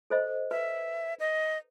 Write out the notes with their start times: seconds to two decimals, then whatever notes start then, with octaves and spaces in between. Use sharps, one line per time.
0.10 A4 C5 D#5
0.51 B4 E5
1.20 D#5